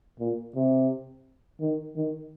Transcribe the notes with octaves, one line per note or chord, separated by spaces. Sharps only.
A#2
C3
D#3
D#3